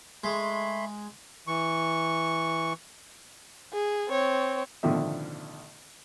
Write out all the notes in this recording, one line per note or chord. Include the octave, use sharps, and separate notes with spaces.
G#3 A3 B5 C6
E3 C#6
G#4
C4 C#5
A1 B2 D3 D#3 F3 E5